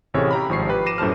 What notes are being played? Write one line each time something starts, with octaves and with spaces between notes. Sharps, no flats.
A1 A2 C3 G#4 C#5
G4 A#5 B5
G#1 F3 C#6 C7
G4 B4
D6 A#6 C7 D#7 E7
F#2 A2 C5 A5 F6